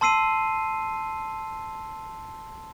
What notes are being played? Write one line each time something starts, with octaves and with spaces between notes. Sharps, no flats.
A5 C6 E6 C7 D#7